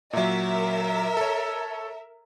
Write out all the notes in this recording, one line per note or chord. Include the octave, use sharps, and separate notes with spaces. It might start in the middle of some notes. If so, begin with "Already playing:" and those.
A#2 F#3 A#4 E5
A4 C#5